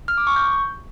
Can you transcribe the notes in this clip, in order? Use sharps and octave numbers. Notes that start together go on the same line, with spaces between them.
F6
D6
C#6
G6